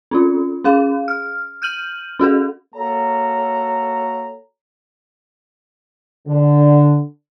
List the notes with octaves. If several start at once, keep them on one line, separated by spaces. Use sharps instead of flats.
C4 C#4 F4
C#4 G#4 F5
F6
F6 G6 D#7 F#7
C#4 F#4 G#4 A4
A#3 F#4 A4 C#5 A#5
D3